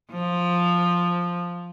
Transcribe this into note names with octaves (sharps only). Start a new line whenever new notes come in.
F3